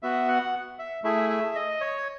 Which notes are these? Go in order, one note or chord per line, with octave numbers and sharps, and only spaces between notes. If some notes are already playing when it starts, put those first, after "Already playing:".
B3 F#4 E5
F#5
E5
A3 E4 G#4 E5
E5
D#5
C#5